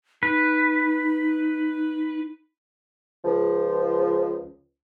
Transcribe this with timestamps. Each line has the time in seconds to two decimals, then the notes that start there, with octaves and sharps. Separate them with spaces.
0.23 D#4 B4
3.25 C#2 F3